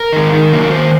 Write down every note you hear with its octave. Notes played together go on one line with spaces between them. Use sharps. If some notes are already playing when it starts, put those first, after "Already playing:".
Already playing: A#4
D#3 G#3
D#3
F#3 A#3
A#4
D#3 C5